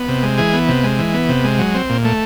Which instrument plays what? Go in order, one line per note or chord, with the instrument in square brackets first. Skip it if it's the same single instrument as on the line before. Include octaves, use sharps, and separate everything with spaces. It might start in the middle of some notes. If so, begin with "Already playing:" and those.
Already playing: [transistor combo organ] B3
C3
G#3
E3 G#4
B3
C3
G#3
E3
B3
C3
G#3
F#3
C4
A#2
A3